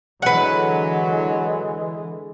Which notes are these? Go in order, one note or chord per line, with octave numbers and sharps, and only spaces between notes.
D3 E3 F#3 G#3 B4 F#5